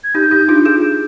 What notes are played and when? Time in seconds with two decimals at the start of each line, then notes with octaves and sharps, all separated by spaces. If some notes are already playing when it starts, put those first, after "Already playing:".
0.04 G#6
0.15 D#4 G4 G6
0.31 D#4 G4
0.48 D4 F4
0.65 F4 G#4